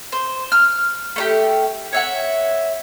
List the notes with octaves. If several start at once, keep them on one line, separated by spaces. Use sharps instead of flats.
C5
F6
A3 D#4 G4
C#5 E5 F#5